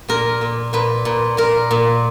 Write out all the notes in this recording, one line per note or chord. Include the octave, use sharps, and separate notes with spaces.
A#2 A#4
A#2
A#2 B4
A#2
A#2 A#4
A#2